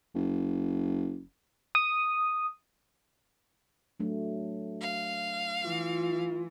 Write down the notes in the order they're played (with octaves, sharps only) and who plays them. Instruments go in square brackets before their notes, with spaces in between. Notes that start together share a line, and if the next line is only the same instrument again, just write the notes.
[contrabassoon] F#1
[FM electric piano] D#6
[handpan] F#3 A3 D4
[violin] F5
[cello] E3 [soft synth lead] F4